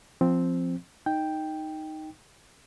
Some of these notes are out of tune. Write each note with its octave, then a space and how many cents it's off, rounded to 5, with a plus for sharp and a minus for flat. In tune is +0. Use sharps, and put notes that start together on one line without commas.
F3 -5 C4 +0
D#4 +0 G5 +0